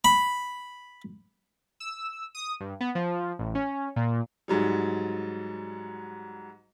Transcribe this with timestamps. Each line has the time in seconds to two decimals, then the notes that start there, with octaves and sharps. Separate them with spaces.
0.05 B5
1.80 E6
2.35 D#6
2.60 G2
2.80 B3
2.95 F3
3.39 A1
3.55 C#4
3.96 A#2
4.48 G#2 F#3 G3